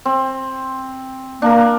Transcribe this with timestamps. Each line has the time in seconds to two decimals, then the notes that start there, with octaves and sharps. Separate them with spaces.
0.05 C4
1.42 A#3 D4 A#4